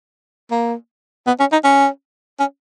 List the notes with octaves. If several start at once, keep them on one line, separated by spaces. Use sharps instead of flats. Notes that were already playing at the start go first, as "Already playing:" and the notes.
A#3
B3
C#4
D#4
C#4
C#4